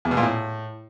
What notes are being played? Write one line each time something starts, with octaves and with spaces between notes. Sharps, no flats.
E2
B2
A#2
A2